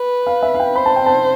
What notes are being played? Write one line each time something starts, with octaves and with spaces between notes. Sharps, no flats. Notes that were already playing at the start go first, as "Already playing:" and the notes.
Already playing: B4
F5
E5
F5
G5
C5 B5
A5
G5
A5